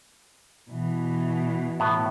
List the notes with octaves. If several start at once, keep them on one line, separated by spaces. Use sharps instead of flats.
B2 E3
A2 B3